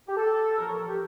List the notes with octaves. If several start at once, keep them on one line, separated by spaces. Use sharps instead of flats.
G4
A4
A#2 F3 A#4
C#5
A4
G4